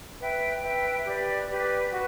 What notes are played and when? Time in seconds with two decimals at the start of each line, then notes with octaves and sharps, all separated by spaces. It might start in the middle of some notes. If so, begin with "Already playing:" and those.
0.20 B4 E5 G5
0.62 B4 E5 G5
1.05 G4 B4 D5
1.49 G4 B4 D5
1.91 F#4 B4